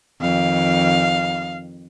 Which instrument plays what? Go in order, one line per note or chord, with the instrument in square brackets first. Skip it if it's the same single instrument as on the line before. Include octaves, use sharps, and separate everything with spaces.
[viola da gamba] F2 D#3 [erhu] F5